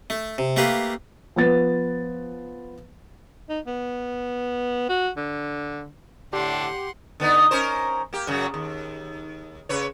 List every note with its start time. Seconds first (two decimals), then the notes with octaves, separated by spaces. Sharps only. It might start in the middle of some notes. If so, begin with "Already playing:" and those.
0.10 A3
0.38 C3
0.56 A3 A#3 G4 B4 F5
1.36 F3 B3 A6
3.49 D#4
3.67 B3
4.89 F#4
5.17 D3
6.33 A2 D3 D4 G4 F#5 C6
7.20 D3 B3 D#4
7.51 C#4 A#4 C5
8.13 A#3 G4
8.27 F#2 C#3 F#3
8.54 D#2
9.69 C#3 B4 C#5